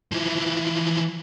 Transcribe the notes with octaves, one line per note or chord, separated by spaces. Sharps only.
E3 F3